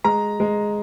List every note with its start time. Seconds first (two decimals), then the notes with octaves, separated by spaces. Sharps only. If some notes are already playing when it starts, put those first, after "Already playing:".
0.04 G#3 A#5
0.40 G#3